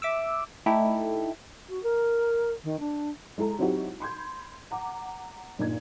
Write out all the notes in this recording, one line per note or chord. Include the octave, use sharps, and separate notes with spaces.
E5 D6 E6
A3 D#4 E4 G4 A4
F#4
A#4
D#3
D4
G#3 E4 A4 A#5
F#3 C4 D#4 E4 F#4 G4
B5 C6 G6 G#6
F#5 A#5 D6
G2 A#2 D#4 G#6